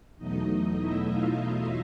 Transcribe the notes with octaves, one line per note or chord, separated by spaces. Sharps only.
E2 B2 F#3 A3 D#4 D#5
E4 E5
F4 F5